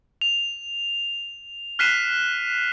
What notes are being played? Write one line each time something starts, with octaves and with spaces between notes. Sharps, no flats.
F7
F6 F#6 B6 C7 D#7 E7